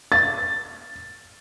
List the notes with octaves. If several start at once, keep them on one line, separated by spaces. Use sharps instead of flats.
A6